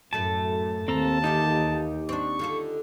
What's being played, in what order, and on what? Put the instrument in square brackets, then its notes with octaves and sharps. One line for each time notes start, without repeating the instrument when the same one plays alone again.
[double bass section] F#2 [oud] A2 A3 E4 [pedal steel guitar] A5
[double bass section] D#2 [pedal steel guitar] C4 A4 A#5 [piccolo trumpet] A5
[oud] E2 D#3 A4 [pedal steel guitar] D#4 G4
[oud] C4 D4 [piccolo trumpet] C#6
[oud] D3 F4 A4